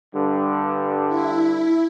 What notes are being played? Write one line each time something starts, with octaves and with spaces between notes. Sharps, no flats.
G2 D3
E4